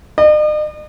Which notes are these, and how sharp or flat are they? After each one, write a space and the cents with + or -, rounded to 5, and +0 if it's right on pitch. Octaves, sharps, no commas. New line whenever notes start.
D#5 -45